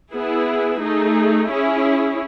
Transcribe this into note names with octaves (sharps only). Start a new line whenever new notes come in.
B3 E4 G#4
A3 D#4 G#4
C#4 E4 G#4